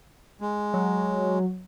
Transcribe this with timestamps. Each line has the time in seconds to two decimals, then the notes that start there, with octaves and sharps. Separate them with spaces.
0.41 G#3
0.74 F#3